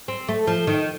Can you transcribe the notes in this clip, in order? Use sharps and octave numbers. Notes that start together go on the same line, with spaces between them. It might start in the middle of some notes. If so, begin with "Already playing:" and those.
C4
A3
F3
D#3